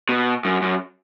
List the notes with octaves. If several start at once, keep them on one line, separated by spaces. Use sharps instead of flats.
B2
F#2
F#2